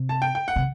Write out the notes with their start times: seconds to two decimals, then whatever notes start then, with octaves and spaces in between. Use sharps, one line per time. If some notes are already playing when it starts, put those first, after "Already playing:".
Already playing: C3
0.09 A5
0.22 G5
0.35 G5
0.48 F#5
0.56 C3